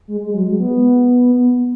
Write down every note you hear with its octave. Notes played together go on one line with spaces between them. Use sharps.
G#3
G#3
F#3
G#3
B3